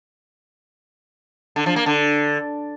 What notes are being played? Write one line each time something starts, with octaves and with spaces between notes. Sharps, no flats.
D3
F3
A#3
D3